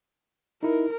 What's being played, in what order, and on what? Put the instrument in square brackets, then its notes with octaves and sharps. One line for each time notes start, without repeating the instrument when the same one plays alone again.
[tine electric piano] D#4 E4 [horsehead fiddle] A#4